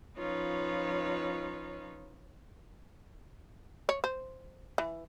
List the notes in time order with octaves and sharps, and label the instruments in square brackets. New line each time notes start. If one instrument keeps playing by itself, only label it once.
[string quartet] F3 C#4 D#4 F4 B4 C#5
[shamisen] C#5
C5
E3